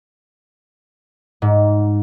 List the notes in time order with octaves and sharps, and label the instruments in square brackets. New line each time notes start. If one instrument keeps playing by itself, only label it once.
[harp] G#2